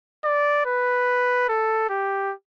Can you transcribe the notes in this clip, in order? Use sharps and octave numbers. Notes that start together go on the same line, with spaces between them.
D5
B4
A4
G4